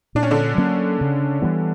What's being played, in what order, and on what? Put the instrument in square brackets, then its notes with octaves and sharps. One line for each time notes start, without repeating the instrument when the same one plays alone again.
[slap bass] A#2 [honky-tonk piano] D4
[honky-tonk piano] C#4
D3 D4
[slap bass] F#3 A#3 C#4
C#3
E3 G3 B3